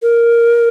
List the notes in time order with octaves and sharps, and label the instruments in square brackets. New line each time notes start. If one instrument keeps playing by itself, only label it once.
[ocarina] A#4